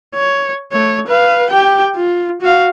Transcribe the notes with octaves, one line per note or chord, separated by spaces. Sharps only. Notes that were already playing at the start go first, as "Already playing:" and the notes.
C#5
A3 C#5
B4 F5
G4 G5
F4
F#4 F5